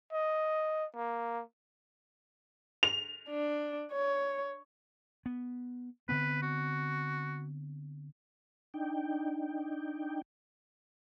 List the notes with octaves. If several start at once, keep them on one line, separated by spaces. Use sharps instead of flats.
D#5
A#3
F7
D4
C#5
B3
D3 B3 C4 B4
F#4
D4 D#4 G5